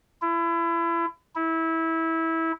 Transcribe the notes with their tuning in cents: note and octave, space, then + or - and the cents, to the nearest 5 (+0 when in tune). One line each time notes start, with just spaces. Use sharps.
E4 +30
E4 -20